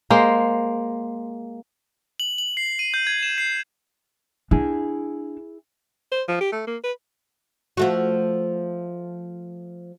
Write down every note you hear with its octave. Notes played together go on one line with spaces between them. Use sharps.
G#3 A#3 C5
F#7
F#7
C7
D#7
G6
G#6
E7
C7
D4 E4 G#4
C5
F3
G4
A3
A#3
B4
F3 A3 F#4